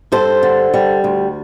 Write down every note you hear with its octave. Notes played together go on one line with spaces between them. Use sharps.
G2 A4 C5
D3
G3
D2